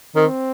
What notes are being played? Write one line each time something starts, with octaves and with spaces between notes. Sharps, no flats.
D#3 C4